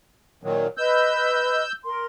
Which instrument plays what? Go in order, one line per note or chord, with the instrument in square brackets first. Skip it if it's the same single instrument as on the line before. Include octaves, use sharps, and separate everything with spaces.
[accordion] A#2 D#3 F#3
[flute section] B4 D#5 [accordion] E6 G6
[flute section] A#4 C6